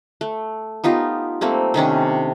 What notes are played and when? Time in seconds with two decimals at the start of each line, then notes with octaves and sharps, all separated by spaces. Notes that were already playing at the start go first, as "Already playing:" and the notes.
0.21 A3
0.84 B3 D#4 F4 G4
1.41 G3 A3 A#3 C4
1.74 C3 D#3 C#4 D4